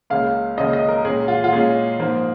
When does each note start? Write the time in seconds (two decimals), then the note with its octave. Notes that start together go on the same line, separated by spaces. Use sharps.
0.10 C#2 C#3 A#3 C#4 F5
0.57 C#2 C#3 A#3 C#4 D#5
0.73 D#5
0.88 A#4
1.05 A#2 G#3 C#4 G#4
1.28 F4
1.44 F4
1.52 A#2 G#3 C#4 G#4
1.99 G#2 F3 A#3